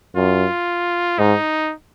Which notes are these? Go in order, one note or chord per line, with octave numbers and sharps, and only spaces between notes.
F#2 F4
G#2 D#4